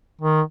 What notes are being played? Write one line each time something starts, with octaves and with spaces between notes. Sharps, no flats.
D#3